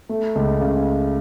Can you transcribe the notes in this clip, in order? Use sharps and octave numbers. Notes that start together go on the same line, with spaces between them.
A3
C#2
C#3